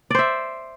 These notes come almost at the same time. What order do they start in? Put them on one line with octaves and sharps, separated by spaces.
D5 C5 E5